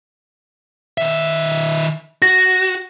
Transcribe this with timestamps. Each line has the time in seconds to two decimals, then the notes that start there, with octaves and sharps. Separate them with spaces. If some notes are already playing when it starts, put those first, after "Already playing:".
0.98 D#3 E5
2.22 F#4 A#6